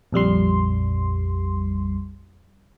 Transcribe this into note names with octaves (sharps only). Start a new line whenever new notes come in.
A#1 F2 G3 C6